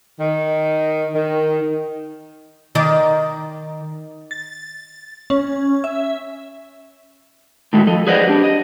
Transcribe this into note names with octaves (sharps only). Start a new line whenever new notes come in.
D#3
D#3
D#3 D5
A6
C#4
E5
A2 D#3 G#3 A3 F#4
F3 A4 D#5
G#4 B4 C5 D5 D#5 F#5
D4 G4
D#5